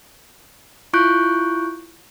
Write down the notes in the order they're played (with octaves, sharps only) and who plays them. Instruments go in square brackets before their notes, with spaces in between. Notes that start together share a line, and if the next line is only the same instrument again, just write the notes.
[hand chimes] E4 F4 C#6 F#6 G6 D7